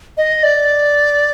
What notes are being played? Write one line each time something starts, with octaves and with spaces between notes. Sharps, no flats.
D#5
D5